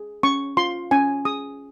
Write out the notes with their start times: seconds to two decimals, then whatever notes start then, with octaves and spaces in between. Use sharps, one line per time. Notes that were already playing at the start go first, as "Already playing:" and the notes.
Already playing: G#4
0.23 C#4 C#6
0.57 F4 C6
0.91 C#4 G#5
1.25 G#4 D#6